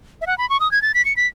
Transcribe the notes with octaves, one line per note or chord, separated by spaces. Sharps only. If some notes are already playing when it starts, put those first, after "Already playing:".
E5
F#5
B5
C#6
D#6
G#6
A6
B6
C#7
B6